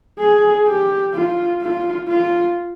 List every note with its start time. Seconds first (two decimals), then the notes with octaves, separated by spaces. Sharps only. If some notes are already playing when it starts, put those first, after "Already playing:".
0.19 G#4
0.67 G4
1.14 F4
1.61 F4
2.08 F4